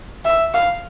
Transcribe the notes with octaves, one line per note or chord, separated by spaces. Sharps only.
E5
F5